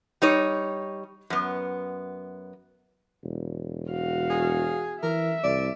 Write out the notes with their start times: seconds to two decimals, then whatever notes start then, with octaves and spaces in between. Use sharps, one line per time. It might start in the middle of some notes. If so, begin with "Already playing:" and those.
0.22 G3 D#4 C#5
1.30 F#2 B3
3.23 E1
3.90 F#4 F5
4.30 G#4
5.03 E3 A#4 E5
5.44 C2 D5